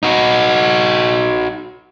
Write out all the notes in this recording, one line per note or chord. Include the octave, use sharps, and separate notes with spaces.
D#4 F#4